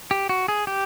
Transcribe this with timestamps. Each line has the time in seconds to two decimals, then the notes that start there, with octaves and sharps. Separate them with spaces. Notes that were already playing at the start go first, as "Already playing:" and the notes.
0.11 G4
0.29 F#4
0.48 G#4
0.67 G4